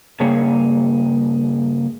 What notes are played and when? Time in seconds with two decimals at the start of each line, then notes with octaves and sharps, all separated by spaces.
0.20 G2 C#3 A#3 G#4 C#5